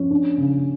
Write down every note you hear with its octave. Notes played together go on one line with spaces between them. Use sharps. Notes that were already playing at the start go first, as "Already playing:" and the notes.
Already playing: F3 C#4
D4
C#3